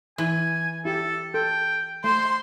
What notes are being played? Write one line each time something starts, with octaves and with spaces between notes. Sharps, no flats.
E3 G#5
E4 G4 A4
A4 G5
A3 C5 C6